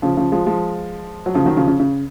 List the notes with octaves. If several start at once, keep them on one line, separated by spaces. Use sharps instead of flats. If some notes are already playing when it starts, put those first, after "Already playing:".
C#3 F3
C#3 F3
F3 G#3
F3 G#3
F#3
C#3 F3
D#3 F#3
C#3 F3
C#3
C#3